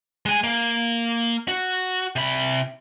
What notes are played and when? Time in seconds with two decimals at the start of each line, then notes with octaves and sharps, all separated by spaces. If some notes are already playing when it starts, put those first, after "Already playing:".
0.26 G#3 G#5
0.44 A#3
1.48 F#4
2.16 C3 B5